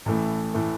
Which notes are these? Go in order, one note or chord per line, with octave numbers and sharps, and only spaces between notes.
A1 A2 E3 A3
A2 E3 A3